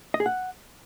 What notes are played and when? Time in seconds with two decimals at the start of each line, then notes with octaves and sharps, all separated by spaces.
0.14 D#5
0.20 G#4
0.26 F#5